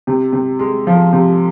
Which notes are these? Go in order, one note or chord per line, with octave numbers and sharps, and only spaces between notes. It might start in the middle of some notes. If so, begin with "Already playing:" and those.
C3
C3
G#3
F3
C3